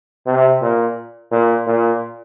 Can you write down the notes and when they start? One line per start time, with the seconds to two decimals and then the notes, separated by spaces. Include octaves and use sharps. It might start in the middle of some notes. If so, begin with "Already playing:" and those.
0.26 C3
0.62 A#2
1.32 A#2
1.67 A#2